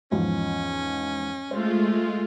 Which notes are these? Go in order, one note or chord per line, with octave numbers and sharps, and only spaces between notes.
E2 G#2 F3 C#4
G#3 A3 F4 C5